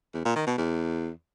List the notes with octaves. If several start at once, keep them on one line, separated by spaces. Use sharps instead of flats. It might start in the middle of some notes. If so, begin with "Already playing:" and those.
E2
A#2
D#3
B2
E2